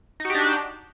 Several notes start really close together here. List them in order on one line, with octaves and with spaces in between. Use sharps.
D#4 F#4 G4 D4